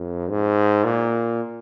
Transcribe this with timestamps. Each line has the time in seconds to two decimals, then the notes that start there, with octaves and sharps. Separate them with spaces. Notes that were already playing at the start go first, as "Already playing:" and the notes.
Already playing: F2
0.30 G#2
0.84 A#2